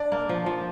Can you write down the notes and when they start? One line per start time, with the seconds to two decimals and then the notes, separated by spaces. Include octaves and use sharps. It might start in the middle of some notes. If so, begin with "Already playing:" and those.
Already playing: D4 D5
0.12 A#3
0.29 F3
0.46 F3